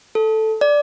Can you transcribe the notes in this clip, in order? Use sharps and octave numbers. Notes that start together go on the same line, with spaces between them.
A4
D5